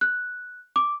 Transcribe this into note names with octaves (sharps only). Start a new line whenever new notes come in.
F#6
D6